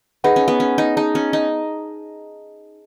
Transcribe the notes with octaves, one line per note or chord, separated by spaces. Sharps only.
D#4 G#4 B4 F#5 B5
C#4
B3
C#4
D#4
D#4 G#4 D#5 A5
C#4
D#4